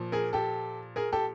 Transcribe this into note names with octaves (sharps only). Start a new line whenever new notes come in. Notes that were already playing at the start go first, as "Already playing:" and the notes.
Already playing: A#2 F3
G#4 A#4
G4 A4
G#4 A#4
G4 A4